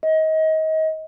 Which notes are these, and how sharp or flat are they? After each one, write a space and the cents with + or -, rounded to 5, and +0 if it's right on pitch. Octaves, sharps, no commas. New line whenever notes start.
D#5 +25